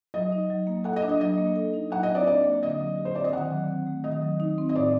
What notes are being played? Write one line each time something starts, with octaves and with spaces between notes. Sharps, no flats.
F#3 D#5
D#4
F#3
A#3
A4 F#5
D#5
D4
D#5
F#3 D#5
A#3
A4
D#4
F#3 F#5
D#5
C4
D5
D4 D5
A#3
D3 D#5
F#3
G4
C5
C4 D5
D#5
D#3 F#5
F#3
C4
A3
D#3 D#5
F#3
D#4
C4
D#5
A2 D5